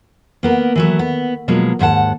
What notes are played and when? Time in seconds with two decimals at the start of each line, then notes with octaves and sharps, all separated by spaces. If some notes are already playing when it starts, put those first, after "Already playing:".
0.43 A#3 B3 A#4
0.76 E3 F#3 A3
0.99 B3
1.48 B2 F3 F#3 G#3 A#3
1.79 D#2 G#2 E5 F#5 A5